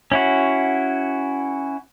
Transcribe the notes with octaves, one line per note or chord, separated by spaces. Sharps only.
C#4 E4 F#4